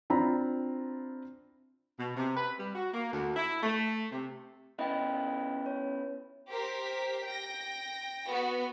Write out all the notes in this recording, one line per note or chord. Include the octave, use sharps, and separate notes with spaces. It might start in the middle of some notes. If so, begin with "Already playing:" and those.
C4 D4 E4 F4 A#5 B5
B2
C3
B4
G3
F#4
A#3
D2
E4
A3
C3
B3 C#4 E4 D#5 G5
C#5
G4 A#4 C5 B6
G5 A#6
B3 F#4